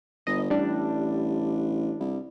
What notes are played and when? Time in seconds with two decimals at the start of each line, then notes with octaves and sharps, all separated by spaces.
0.27 G1 D#5
0.50 A1 G3 D4
2.00 C2